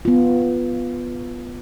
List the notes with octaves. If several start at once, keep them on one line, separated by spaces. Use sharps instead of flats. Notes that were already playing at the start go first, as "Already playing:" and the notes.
B3 F4